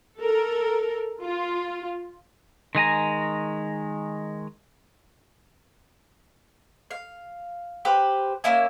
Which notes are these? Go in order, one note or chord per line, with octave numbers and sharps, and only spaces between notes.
A4 A#4
F4
D#3 G#3 G#5 A#5
F5
G4 B4 C5
A#3 C#4 E4 G#5